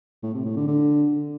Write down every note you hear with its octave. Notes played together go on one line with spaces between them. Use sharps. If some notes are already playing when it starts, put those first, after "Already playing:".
A2
C3
A2
D3
D3